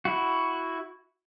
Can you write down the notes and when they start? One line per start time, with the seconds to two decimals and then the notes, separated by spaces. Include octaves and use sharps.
0.05 E4 F#4